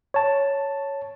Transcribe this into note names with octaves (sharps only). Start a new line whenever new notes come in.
C#5 A5